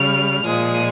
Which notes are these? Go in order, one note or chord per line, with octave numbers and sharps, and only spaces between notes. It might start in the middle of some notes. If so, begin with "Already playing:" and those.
Already playing: C#3 G3 F6
A#2 F3 G#3 D#6